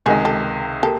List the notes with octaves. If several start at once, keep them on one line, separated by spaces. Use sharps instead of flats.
C#2 C3 D#3 G#3 F#4 G#4
G4 A4
A#3 G4 A4